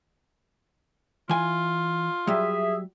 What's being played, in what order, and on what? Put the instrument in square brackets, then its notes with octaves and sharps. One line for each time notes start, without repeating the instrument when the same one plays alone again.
[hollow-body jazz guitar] E3 G#5 [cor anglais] F4
[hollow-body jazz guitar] F#3 G3 [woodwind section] G#4 E5